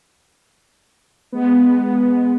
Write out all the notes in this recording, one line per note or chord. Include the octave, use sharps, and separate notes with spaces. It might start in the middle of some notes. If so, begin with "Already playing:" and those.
G#3 B3